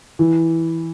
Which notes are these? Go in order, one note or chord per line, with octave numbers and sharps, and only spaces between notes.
E3